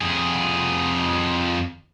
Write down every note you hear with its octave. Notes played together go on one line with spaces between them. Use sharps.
F2 G#4